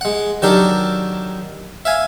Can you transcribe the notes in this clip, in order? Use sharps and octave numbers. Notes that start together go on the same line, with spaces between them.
G#3 F#5
D#3 F#3 D4 G4 A4 A#4
E5 F5 G#5